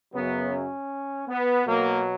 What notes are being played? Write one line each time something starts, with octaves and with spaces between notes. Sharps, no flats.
F#2 C#3 F#3 B3
C#4
B3
B2 F#3 A#3